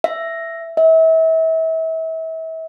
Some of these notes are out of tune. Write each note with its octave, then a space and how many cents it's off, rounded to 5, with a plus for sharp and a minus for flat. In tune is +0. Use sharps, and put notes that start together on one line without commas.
E5 +10
E5 -35